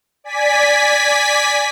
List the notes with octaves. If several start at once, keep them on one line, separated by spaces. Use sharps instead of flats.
D5 G#5 B6